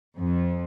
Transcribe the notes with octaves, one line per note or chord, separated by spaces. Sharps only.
F2